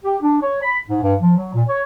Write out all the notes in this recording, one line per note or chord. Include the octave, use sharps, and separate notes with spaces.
G4
D4
C#5
B5
G#2
G2
F3
F#3
A#2
C#5